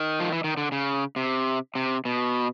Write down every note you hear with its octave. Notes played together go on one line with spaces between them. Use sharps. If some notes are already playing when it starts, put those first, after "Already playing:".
Already playing: D#3
F3
E3
D#3
D3
C#3
C3
C3
B2